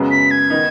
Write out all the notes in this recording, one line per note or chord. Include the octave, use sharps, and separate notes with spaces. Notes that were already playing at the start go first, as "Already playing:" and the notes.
Already playing: F#2 C#3 G#3 B3
B6
G#6
D#3 B3 D#4